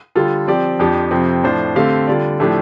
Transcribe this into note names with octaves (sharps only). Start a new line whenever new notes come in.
D3 G3 F4 A4
F3 C4 G4 D5
F2 F3 D4 G4
F2 C3 F3 C4
A2 F3 D4 F4 C5
D3 A3 C4 G4 F5
D3 G3 F4 D5
A2 F3 A3 D4 G4